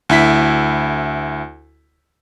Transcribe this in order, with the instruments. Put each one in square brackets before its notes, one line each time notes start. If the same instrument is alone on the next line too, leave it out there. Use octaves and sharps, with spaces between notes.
[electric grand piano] D2 E4 B6